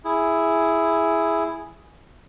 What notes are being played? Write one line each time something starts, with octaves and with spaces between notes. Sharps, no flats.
E4 G#4